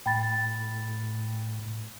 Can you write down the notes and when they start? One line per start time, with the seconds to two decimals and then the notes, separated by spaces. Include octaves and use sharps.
0.06 A2 G5 B5 A6